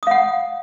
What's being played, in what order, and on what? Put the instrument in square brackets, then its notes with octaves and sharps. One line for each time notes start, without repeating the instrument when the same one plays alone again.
[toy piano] D#6
F5
F#5